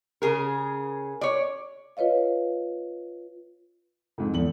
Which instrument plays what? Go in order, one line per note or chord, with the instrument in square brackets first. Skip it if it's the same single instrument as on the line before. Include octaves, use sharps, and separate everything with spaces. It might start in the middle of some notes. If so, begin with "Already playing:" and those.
[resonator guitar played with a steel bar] C#3 G#4 A#4
C#5 D5
[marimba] F4 B4 C#5 D#5 F5
[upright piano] F2 G#2
[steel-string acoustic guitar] E2 [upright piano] A4 F#7